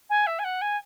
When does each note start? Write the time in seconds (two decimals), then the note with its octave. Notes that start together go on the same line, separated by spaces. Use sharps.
0.10 G#5
0.26 E5
0.39 G#5
0.44 F#5
0.61 G#5